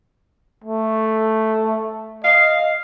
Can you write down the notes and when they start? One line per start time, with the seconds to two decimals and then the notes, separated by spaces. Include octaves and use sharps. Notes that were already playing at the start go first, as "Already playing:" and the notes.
0.64 A3
2.24 D#5 F5